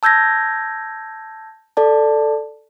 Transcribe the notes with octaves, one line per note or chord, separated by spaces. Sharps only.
A5 E6 G6 G#6 A#6
A4 D5 A5